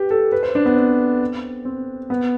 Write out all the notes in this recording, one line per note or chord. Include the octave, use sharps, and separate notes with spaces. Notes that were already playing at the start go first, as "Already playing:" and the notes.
Already playing: G4 B4
A4
B4
C5
D4
B3
C4
C4
B3